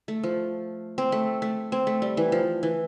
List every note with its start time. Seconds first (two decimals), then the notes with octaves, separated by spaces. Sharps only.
0.08 A3
0.23 F3
0.98 C4
1.12 A3
1.42 A3
1.72 C4
1.87 A3
2.02 G3
2.17 E3
2.32 F3
2.63 E3